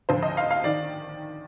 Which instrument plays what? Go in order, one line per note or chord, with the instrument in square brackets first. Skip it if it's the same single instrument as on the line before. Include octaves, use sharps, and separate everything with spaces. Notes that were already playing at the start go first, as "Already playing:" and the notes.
[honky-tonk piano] D2 D3 F3 C5
D#5
F5
F5
D#3 D5